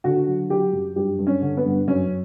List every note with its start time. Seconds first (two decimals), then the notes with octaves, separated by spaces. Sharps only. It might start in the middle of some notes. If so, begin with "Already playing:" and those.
0.04 D3 F#4
0.27 F#3
0.50 F#3 G4
0.73 F#2
0.96 G2 G4
1.19 G2
1.27 C#4
1.41 D3
1.57 B3
1.65 G2
1.88 F#2 C#4